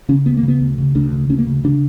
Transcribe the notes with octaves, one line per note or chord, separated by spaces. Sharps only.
C#3 C#4
D2 B3
A#3
C#3
B3
D2
C#3
D2 D4
C#3
D2 C#4
A#3
C#3
C#3 D4